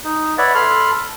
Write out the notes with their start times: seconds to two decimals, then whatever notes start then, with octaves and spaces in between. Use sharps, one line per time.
0.04 D#4
0.38 B4 C#5 D5 E5 F#5
0.55 A4 B5 C6 F6